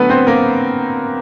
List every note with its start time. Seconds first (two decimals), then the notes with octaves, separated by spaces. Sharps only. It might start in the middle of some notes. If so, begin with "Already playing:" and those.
Already playing: D3 F#3 A3 B3 A4 B4
0.09 C4 C5
0.27 A#3 A#4